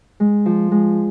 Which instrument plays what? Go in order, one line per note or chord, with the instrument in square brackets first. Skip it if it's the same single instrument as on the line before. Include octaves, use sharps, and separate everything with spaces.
[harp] G#3
F3
G#3